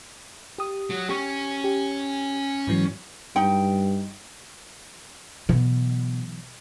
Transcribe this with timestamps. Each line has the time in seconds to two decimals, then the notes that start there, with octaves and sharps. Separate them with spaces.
0.58 G4 D#6
0.90 F#3
1.09 C#4 G4 C#6
1.64 G4
2.67 G#2 E3 F#3
3.36 G2 D#4 G5
5.49 B2 E3 F#3 B3